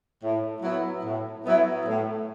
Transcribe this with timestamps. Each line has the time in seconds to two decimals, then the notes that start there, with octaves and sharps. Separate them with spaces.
0.23 A2
0.63 F#3 B3 E4
1.04 A2
1.46 F#3 B3 E4
1.86 A2